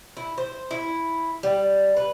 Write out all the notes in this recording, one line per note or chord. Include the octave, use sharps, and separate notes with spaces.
E4
C5
E4
G3
B4